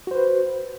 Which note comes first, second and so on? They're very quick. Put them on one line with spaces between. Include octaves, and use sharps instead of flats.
F#4 C5 B4